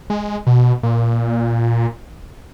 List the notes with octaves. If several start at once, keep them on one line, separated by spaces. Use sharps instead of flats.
G#3
B2
A#2